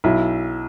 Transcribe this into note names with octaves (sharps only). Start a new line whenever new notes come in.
B1 E4